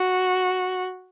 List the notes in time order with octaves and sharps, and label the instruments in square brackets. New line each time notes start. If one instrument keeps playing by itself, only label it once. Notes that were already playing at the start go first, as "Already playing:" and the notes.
Already playing: [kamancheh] F#4